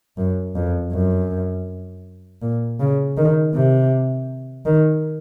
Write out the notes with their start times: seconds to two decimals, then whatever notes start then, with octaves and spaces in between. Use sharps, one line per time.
0.17 F#2
0.55 F2
0.92 F#2
2.42 A#2
2.80 C#3
3.17 D#3
3.54 C3
4.65 D#3